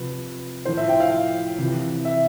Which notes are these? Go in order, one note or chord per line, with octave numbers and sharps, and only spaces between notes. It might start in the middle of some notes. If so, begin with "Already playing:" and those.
Already playing: C3 F3 B4
A2 F3 C5
E5
G5
F5
C3 E3
E5